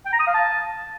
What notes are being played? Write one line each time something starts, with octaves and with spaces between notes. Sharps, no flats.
G5
A#5
D#6
F5
A5